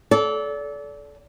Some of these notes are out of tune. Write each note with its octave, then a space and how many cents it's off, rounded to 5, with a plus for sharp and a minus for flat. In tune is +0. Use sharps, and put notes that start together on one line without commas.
A4 -25 D5 -30